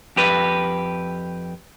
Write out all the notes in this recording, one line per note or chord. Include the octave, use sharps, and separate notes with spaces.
F2 G4 B4